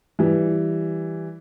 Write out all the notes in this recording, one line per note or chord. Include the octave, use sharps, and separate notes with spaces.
E3 G3